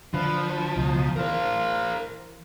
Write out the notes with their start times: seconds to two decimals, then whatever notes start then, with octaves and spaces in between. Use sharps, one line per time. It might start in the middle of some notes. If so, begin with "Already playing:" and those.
0.14 D3 F3 B4
0.76 C#2 B2 D#4
1.16 E3 A#4 C5 F5